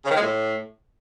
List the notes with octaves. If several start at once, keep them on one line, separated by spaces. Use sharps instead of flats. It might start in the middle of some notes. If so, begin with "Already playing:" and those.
C#3
D#3
G#3
A2